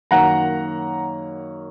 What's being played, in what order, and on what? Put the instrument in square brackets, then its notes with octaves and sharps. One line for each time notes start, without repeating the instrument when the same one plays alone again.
[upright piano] F#2 D#3 A#3 F#5 A#5